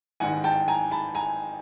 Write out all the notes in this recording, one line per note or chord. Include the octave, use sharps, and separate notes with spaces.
A1 G#2 D#3 F#5 G#5
G5 A5
G#5 A#5
A5 B5
G#5 A#5